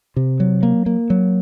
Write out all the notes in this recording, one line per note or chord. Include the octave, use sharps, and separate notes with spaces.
C3
F#3
A#3
A#3
F#3